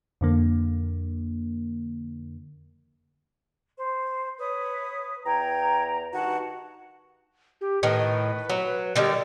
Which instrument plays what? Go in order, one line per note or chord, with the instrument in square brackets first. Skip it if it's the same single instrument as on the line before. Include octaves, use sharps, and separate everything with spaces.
[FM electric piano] F2 D3 A#3
[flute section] C5
B4 C#5 D#6
[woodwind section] E2 A#5 [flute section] G5 G#6
[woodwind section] G2 D#3 F#4 [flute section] F#5 A5
[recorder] G4
[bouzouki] A2 D#3 [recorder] B4
[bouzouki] F#3
D3 D#3 G3